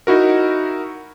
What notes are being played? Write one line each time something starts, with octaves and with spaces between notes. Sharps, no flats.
D#4 E4 F#4 A#4